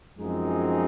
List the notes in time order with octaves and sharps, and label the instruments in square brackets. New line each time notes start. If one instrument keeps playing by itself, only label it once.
[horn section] F#2 F3 G#3 C4 D#4